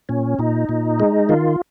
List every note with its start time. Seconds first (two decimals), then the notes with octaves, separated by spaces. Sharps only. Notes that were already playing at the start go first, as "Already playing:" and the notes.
0.09 A#2 C#4
0.39 A#2 D#4
0.69 A#2
1.00 G#3
1.29 D#3 F4